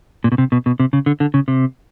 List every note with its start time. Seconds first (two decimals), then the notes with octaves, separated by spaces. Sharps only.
0.24 A#2
0.32 B2
0.38 C3
0.52 B2
0.66 B2
0.80 C3
0.93 C#3
1.06 D3
1.20 D3
1.34 C#3
1.48 C3